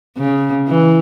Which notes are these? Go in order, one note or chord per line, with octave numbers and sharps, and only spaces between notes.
C#3
E3